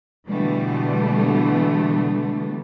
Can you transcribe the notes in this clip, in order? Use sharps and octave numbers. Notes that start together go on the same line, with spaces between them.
B2 D3 E3 G3 A3 B3